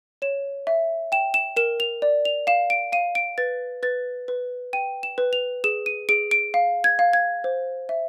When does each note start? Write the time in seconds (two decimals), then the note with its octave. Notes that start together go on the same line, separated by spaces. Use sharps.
0.22 C#5 E7
0.67 E5
1.12 G5 E7
1.34 E7
1.56 A#4 E7
1.80 F7
2.02 D5
2.25 F7
2.47 F5 E7
2.70 D7
2.92 F5 D#7
3.15 D7
3.38 B4 A6
3.83 B4 A6
4.28 B4
4.73 G5 D#7
5.03 E7
5.18 B4
5.33 F7
5.64 G#4 E7
5.86 D#7
6.09 G#4 D7
6.31 D7
6.54 F5
6.84 G#6
6.99 F5
7.13 G#6
7.44 C5
7.89 E5